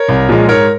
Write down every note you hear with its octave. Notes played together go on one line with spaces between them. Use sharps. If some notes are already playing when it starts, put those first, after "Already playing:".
Already playing: A#4 C#5
C2
A#2 F3 G#3
G#2 A#4 C#5